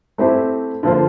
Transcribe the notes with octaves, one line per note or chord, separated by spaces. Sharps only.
A3 C4 E4 G4 C5
D3 F3 A#3 F4 C5